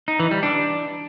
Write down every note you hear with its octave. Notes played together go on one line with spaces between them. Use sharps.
D#4
E3
G3
D4